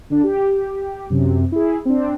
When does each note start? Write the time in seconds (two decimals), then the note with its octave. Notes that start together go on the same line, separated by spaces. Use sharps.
0.10 D3 D4
0.24 G4
1.10 F#2 C3
1.52 E4 G#4
1.85 C4 D4